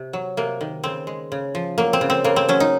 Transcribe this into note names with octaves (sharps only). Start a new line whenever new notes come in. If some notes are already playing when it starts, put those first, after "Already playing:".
Already playing: C3
F#3
C3 A#3
D#3
C#3 C4
G#3
C#3
F3
F#3 A#3
C4
C#3
C4
C#3 A#3
C4
F#3 C#4
D#4